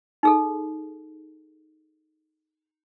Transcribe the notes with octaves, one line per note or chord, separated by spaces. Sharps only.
D#4 G#4 A4